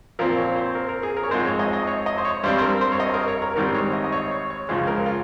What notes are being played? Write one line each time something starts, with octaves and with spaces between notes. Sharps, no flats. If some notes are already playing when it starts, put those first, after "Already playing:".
A#2 F3 C4 A#4
C#5
C5
A#4
A#4
G#4
A#4
C#5
G#2 F3 G#3 C4 C5
C#5
D#5
D#5
C#5
D#5
C5
C#5
G2 G3 C4 C5
C5
A#4
C5
C#5
D#5
A#4
C#5
A#4
G#2 D#3 G3 C4 A#4
C#5
D#5
D#5
C#5
C#5
C#5
C#2 C#3 F3 G#3 C5
A#4
F4